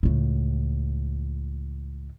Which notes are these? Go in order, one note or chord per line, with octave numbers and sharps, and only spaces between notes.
C#2 A2